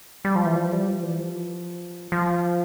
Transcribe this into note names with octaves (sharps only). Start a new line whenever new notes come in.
G3
F3
E3
F3
G3
F3
E3
F3
F3